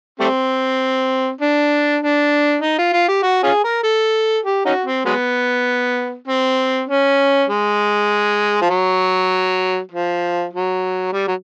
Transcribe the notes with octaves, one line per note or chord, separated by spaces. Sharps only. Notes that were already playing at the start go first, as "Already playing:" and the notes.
G3 A3 C4
D4
D4
D#4
F4
F4
G4
F#4
C#4 F4 G#4
A#4
A4
G4
C#4 D#4 F#4
C4
F#3 G#3 B3
C4
C#4
G#3
F3
F#3
F3
F#3
G3
F#3